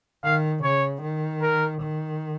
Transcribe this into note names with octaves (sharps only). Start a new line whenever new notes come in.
D#3 F5
C#3 C#5
D#3
A#4
D#3